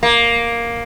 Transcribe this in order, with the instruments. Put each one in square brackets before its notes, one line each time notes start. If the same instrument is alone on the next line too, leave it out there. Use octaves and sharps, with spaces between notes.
[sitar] A#3